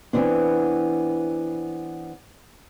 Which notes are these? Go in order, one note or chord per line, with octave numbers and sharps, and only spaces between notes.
E3 B3 C4 D4